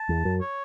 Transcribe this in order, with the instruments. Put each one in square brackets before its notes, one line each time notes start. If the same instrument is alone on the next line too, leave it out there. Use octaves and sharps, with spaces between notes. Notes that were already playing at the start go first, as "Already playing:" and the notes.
Already playing: [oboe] A5
[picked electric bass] E2
F#2
[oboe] C#5